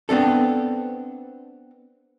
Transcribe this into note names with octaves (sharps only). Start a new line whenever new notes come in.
B3 C4 D4 A4